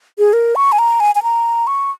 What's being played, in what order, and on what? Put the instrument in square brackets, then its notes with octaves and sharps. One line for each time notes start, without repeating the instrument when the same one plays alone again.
[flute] G#4
A#4
C#6
G#5
A#5
G#5
G#5
A#5
C#6